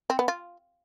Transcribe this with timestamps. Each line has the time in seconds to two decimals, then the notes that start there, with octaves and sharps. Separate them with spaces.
0.10 C4
0.19 B3
0.28 F4